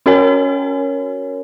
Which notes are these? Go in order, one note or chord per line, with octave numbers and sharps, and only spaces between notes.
C#4 F#4 A#4 C#5 G#5